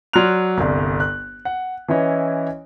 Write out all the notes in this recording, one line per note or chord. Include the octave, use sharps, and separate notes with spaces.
F#3 D5 C6 F6 F#6 F7
G1 C2
F#6
F#5
E3 C#4 E4 C#5 D#5